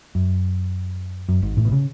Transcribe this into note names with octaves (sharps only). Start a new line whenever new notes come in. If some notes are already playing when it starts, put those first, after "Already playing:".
F#2
F#2
G#1 G#2
A1 A2
B2
C#3